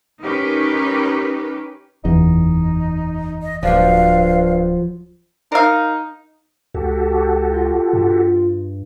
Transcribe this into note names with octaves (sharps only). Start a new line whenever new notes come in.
C#4 D#4 G4 A#4 B4
F#1 E2 D#4
D#5
D1 G2 F3 F#3 D4 F5
D#4 A#4 F5
C#2 F#4 G4 A4
F4
G2